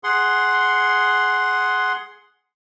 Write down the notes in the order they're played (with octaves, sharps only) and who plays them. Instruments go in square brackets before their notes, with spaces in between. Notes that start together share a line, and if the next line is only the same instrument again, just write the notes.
[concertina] G#4 F#5 C6